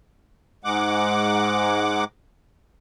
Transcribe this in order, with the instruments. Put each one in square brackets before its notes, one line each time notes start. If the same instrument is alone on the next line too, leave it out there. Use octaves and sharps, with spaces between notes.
[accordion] G#2 G#3 F#5 D6